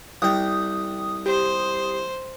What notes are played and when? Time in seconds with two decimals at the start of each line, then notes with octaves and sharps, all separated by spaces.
0.22 C2 G5 D#6
1.26 G4 C5